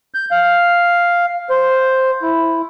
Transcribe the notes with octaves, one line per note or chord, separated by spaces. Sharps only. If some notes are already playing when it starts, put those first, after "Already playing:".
G6
F5
C5
E4